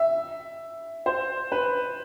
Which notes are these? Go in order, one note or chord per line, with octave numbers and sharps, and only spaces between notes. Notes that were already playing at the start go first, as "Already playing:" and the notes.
Already playing: E5
C5
B4